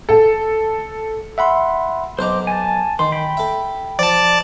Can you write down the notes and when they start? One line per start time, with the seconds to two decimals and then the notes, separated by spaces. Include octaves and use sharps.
0.09 A4
1.38 E5 F#5 B5 C6
2.19 B1 C5 D#5 A#5 D6
2.47 G#5 A5
2.99 D#3 C6
3.12 G5 B5
3.37 A4 E5
3.99 F3 D5 A5